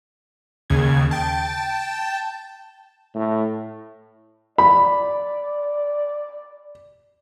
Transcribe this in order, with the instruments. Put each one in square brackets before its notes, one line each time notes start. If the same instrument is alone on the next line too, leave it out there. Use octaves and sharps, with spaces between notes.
[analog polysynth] D#2 C#3 G#6
G5 A5
[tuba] A2
[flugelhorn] D5 [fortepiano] B5